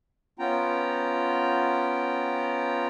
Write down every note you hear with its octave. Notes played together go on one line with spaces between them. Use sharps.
B3 C#4 F4 G5 A#5